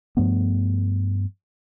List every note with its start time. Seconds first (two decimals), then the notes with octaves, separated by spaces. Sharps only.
0.17 G2 F3 A3 B3